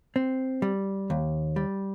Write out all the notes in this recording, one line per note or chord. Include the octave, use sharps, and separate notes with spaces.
C4
G3
D#2
G3